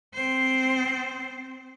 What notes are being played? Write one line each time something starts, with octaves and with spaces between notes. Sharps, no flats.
C4 C5